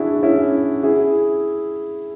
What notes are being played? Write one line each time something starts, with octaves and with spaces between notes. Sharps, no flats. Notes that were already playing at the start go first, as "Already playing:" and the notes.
Already playing: D4 E4 F#4 G#4
C#4 E4
E4 G#4